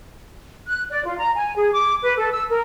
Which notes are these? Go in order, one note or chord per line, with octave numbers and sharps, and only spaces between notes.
F#6
D5
F4
A#5
G#5
G#4
D6
B4
A4
E6
A#4